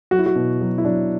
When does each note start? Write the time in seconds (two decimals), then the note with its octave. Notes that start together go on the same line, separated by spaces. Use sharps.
0.11 F#3 F#4
0.19 E4
0.26 F#4
0.36 B2
0.61 F#3
0.78 E4
0.85 F#3 D4